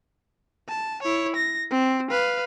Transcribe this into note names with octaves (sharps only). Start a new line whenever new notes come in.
A5
E4 C#5
A#6
C4
B4 F5